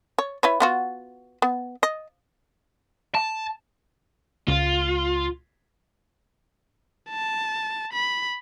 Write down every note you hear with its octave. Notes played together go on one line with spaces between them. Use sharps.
C#5
E4 B4 C#5
B3 F4 F#4
B3
D#5
A5
C#2 F4
A5
B5